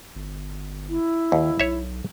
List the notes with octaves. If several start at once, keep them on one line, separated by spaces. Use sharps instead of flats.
G1
E4
D#2 D#3
B1 C#5 E5